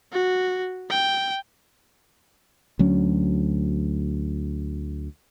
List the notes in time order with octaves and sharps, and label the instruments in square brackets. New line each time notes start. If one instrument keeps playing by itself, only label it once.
[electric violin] F#4
G5
[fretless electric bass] D2 F#3 C#4